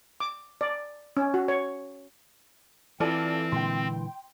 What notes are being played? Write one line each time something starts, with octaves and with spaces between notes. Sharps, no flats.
D6
D5
C#4
F#4
C#5
E3 C4 F4 A4 D5
A#2 D3 G#3 G5 C6